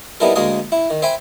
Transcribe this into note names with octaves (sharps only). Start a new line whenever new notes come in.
G3 B3 D#4 E4 A4 A#4
D2 G#3 A#3 G#4 A#4 D#6
E4
D#3
C5 E5 G5 G#5 B5